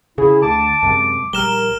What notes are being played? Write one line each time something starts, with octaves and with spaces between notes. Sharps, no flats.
C#3 E4 G#4
D2 A5 D6
F#2 C3 G#3
A#1 G3 A#4 F6 E7 G7